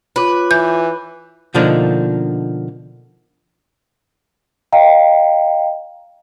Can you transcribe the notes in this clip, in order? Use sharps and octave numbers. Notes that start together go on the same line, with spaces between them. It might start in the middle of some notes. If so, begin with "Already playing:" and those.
F4 B4 C#5 D6
E3 G6
B2 D3 F3 A#3 D4 D#4
D#5 F5 G5 A#5